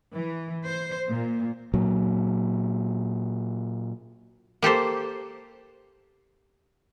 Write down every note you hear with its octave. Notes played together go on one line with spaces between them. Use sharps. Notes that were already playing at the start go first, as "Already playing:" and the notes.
E3
C5
A#2
A#2 F#3
A#3 G4 A4 C5